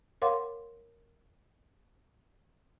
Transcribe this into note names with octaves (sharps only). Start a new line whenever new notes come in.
A#4 C#5 F5 F#5 C6 D6